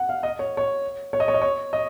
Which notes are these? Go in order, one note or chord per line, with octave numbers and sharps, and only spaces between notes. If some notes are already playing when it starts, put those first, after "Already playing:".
Already playing: F#5
F5
D#5
C#5
C#5
C#5
D#5
C#5
D#5
C#5
D#5